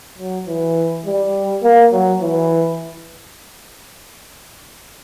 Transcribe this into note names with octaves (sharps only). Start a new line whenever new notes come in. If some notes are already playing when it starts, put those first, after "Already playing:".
F#3
E3
G3
A#3
F#3
E3